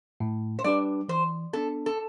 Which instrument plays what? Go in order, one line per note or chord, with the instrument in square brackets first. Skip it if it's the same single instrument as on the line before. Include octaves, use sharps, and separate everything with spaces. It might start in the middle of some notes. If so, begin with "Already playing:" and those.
[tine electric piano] A2
[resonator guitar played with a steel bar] C5
[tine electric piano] G3 D4 G4 B4 [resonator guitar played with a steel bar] D5
[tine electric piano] E3 [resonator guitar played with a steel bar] C5
[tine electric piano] B3 D4 [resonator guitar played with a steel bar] A4
[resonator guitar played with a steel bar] A4